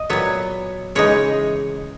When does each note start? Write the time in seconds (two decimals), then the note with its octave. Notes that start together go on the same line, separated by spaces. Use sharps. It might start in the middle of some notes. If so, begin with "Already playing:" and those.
Already playing: D#5
0.10 A#2 F#3 B3 C#5
0.95 C#3 E3 G#3 D#4 C#5